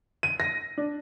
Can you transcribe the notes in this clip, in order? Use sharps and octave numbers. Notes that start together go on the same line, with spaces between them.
D#7
A#6
D4